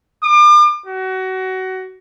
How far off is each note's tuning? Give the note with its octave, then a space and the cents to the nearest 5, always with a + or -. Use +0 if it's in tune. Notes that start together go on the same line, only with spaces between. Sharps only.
D6 +40
F#4 +25